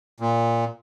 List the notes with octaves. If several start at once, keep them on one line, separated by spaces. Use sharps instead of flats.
A#2